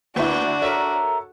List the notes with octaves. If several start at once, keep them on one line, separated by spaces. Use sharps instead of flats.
D2 A#3 D4 E4 F#4 D5
A4 A#4 C#5 E5